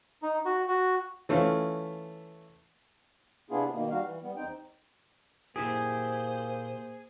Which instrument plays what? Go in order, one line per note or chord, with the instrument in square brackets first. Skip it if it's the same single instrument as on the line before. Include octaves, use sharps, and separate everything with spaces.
[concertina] D#4
F#4
F#4
[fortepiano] E3 A3 C#4 F4
[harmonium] C3 B3 D4 E4 F4 G#4
B2 D#3 A#3
G3 F#4 F5
E3
G3 B3
E2 C4 D#4 G5
[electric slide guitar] A#2 E4 G4 [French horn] A#3 [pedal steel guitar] G#4 [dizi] C5